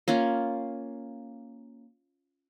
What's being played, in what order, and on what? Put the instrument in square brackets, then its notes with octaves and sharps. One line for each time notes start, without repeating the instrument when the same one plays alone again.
[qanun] A#3 C#4 F4